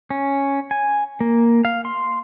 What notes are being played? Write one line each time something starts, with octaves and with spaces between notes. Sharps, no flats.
C#4
G#5
A#3
F5
C6